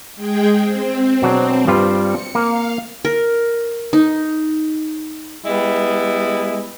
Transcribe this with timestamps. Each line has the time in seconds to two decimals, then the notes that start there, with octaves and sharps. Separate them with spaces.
0.16 G#3 G#4 G5
0.60 C4
1.22 B2 F#3 D4
1.68 G2 G3 F4
2.02 C#7
2.35 A#3 F5
3.05 A#4
3.93 D#4
5.45 G3 G#3 B3 E4